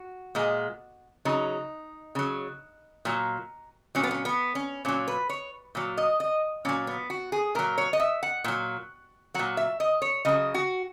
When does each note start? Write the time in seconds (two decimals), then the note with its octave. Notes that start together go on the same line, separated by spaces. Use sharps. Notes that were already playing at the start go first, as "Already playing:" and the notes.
Already playing: F#4
0.35 A#2 G#3
1.25 C#3 F#3 D#4
2.15 C#3 F#3
3.05 A#2 F#3
3.95 A#2 F#3 C#4
4.03 B3
4.11 C#4
4.25 B3
4.55 C#4
4.85 A#2 F#3 C#4
5.08 B4
5.29 C#5
5.75 A#2 F#3
5.97 D#5
6.20 D#5
6.65 A#2 F#3 C#4
6.87 B3
7.10 F#4
7.32 G#4
7.55 A#2 F#3 A#4
7.78 C#5
7.93 D#5
8.00 E5
8.23 F#5
8.44 A#2 F#3
9.34 A#2 F#3 F#5
9.57 E5
9.80 D#5
10.02 C#5
10.25 C#3 F#3 D#5
10.54 F#4